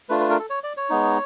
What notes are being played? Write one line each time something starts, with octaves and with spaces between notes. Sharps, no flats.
A3 D4 F4 B4
B4
A#4
A4
C#5
D5
C#5
G#3 B3 D#4